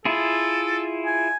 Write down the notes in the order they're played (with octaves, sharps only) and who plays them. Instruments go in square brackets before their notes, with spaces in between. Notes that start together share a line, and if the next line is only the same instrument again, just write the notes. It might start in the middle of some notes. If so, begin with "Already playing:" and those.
[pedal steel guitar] E4 F4 G#4 [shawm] A4
[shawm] G#5